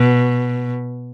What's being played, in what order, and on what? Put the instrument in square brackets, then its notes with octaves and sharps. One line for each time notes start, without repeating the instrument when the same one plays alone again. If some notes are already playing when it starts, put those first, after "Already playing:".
Already playing: [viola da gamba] B2